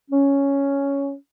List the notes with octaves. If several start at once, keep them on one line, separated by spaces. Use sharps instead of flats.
C#4